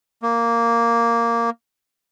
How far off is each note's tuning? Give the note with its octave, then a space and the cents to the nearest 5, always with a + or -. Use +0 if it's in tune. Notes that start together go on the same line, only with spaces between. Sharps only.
A#3 -5